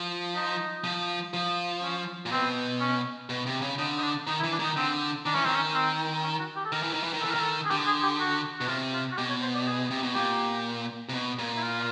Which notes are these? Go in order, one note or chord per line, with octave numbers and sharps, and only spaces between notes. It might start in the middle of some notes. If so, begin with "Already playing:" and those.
Already playing: F3
D#4
F3
F3
C#4
A#2
B2 C4
C#4
B2
C3
C#3
D3 D#4
D#4
D4
D#3 D#4
E4
E3
D4
D#3 D#4
D3 C4
D#3 D4
E3 C#4
D#3 C4
C#4
C4
C#4
F#4
G4
A4
D#3 A#4
E3
D#3
E3
D#3
E3 A4
A#4
D#3
A4
G#4
D3 G4
G#4
G4
F#4
B2 F#4
C3 F4
F4
F#4
B2 G4
C#5
C5
D5
G#4
C3
B2
A#2 G4
C3
B2
A#2
E4
F4